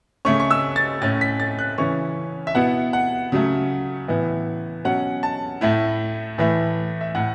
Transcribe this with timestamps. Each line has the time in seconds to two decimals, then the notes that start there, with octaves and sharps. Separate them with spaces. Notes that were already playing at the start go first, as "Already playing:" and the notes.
0.25 C#3 A3 C#4 C#6
0.40 C#6
0.51 E6
0.76 A6
1.01 A2 A3 C#4 A6
1.21 B6
1.40 A6
1.59 F#6
1.78 C#3 E3 C#4 E4 C#6
2.47 E5
2.55 B2 B3 E4 F#5
2.93 F#5
3.32 C#3 F#3 A3
4.08 A2 E3 B3 E4
4.85 B2 F#3 C#4 F#5
5.23 A5
5.61 A2 A3 E4
6.38 A2 E3 A3 E4
7.01 E5
7.15 A2 A3 E4 F#5